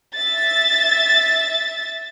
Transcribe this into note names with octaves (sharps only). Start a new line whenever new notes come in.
E5 A6